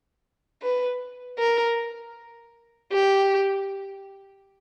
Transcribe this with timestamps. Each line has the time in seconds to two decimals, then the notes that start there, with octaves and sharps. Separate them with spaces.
0.62 B4
1.39 A#4
2.92 G4